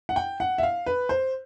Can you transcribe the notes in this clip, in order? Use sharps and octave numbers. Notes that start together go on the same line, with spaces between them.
F#5
G5
F#5
E5
F5
B4
C5